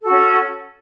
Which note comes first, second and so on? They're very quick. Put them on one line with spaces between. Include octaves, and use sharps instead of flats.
A4 F#4 C#4